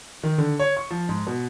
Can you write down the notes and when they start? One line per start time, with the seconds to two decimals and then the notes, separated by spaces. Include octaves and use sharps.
0.23 D#3
0.38 D3
0.59 C#5
0.77 C#6
0.90 F3
1.09 G#2
1.27 B2